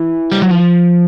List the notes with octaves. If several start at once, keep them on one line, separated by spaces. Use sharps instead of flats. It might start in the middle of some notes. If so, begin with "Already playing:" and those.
Already playing: E3
G3
F#3
F3